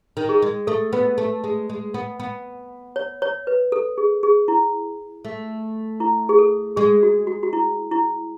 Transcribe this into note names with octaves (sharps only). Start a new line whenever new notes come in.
D#3
G#4
G#3
A3 A4
B3 B4
A3
G#3
G#3
B3
B3
C#5
C#5
B4
A4
G#4
G#4
E4
A3
E4
G#4
A4
G#3 G#4
F#4
F#4
F#4
E4
E4